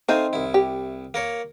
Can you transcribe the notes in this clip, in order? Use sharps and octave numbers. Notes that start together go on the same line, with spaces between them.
A3 C4 D#4 F5 G#5
C2 E4
G4
A#3 A#4 C#5